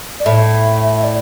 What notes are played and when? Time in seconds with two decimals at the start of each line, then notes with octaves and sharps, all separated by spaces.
0.20 D5
0.26 A2 E5
0.96 E5
1.04 D5